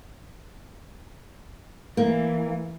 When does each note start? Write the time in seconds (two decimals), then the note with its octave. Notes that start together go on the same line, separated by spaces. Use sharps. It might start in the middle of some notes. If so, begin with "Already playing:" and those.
1.97 E3 A#3